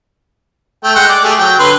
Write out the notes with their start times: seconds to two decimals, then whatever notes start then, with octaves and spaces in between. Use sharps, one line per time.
0.84 A3 G5
0.96 G#3 F#5 G5
1.09 D5
1.24 A3 G4 G#4
1.39 F#3 G5
1.59 D3 B4 C6